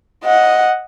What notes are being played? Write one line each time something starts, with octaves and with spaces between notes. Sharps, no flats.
D#5 F#5